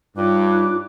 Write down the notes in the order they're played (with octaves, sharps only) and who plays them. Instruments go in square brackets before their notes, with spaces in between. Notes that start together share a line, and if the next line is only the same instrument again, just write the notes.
[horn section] G2 [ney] D#4 [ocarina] F4 [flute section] C#5 D6 F#6